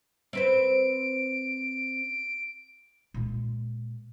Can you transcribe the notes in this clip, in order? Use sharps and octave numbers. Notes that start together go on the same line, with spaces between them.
C4 B4 C5 D7
A#2 G#3